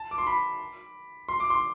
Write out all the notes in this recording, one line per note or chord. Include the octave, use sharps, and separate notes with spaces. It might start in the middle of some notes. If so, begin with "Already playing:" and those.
Already playing: A5
D6
C6
B5
C6
D6
C6